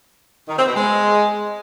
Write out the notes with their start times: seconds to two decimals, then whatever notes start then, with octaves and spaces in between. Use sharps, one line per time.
0.48 D#3
0.57 C4
0.66 B2
0.75 G#3